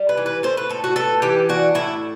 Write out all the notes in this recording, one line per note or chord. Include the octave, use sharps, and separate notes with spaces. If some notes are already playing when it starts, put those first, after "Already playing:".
Already playing: G3
B4
E3
B4
A2 C5
B4
A2 A4
F#4
B3 A4
E3 G4
D4 F#4
A2 E4